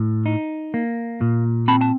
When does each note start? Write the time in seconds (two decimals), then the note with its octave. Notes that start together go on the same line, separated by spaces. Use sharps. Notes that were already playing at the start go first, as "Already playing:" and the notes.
Already playing: A2
0.26 D#4
0.74 A#3
1.21 A#2
1.68 C4 A5 B5
1.81 A5